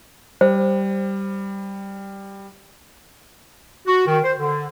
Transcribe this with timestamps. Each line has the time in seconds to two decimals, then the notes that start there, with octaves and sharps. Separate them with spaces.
0.41 G3 C5
3.86 F#4
4.07 D#3
4.23 C5
4.38 D3